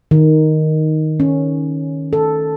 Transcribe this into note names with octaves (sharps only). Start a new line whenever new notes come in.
D#3
C#4
A4